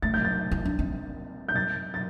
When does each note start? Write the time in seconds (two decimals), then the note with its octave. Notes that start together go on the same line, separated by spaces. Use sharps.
0.02 A3 A6
0.14 G6
0.25 A6
0.52 E4
0.65 D4
0.79 C4
1.48 G6
1.56 A6
1.94 A6